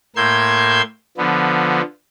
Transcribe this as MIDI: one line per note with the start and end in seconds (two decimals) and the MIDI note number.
0.16 0.81 45
0.16 0.81 58
0.16 0.81 84
0.16 0.81 88
0.16 0.81 91
0.16 0.81 92
1.18 1.81 50
1.18 1.81 53
1.18 1.81 59